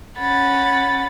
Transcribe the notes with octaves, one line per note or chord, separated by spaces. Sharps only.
C#4 F#5 B5 A6